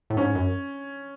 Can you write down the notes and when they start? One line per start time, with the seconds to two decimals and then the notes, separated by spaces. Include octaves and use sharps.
0.10 A2
0.17 G#2 C#4
0.35 F#2